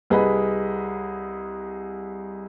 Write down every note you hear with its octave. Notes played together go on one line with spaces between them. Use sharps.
C2 G#4 B4 D#5 B5